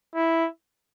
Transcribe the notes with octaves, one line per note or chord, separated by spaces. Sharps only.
E4